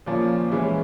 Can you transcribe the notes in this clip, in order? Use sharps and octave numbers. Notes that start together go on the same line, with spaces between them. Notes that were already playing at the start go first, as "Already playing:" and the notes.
A#2 F3 A#3 C#4
E3 G#3 C#4 E4